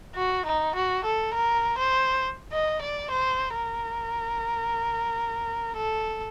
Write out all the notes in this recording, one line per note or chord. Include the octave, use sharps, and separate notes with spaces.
F#4
D#4
F#4
A4
A#4
C5
D#5
D5
C5
A#4
A4